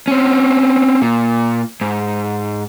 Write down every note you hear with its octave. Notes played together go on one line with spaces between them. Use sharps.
C4 C#4
A#2
G#2